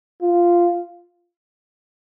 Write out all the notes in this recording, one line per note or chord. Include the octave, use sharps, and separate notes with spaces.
F4